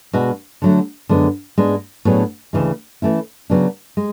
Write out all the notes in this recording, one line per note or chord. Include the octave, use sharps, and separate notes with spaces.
B2 G#3 D4 F#4
D3 F#3 A3
F#2 D3 G#3 B3
G#2 G#3 B3 D4
A2 F#3 B3 D4 G#4
D2 C#3 E3 G#3
E3 A3 C#4 E4
C#3 F#3 B3 D4
G#3